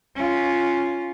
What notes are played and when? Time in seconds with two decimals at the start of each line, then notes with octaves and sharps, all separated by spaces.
0.16 C#4 F4